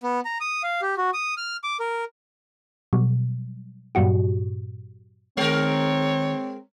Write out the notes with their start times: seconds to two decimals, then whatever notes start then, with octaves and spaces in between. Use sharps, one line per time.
0.03 B3
0.25 A#5
0.41 D#6
0.63 F5
0.82 G4
0.97 F#4
1.14 D#6
1.37 F6
1.64 D6
1.80 A#4
2.93 B2 F#3 G3
3.95 G2 A#2 F#3 F#4 G4
5.37 D#3 G#3 C4 A#4 C#5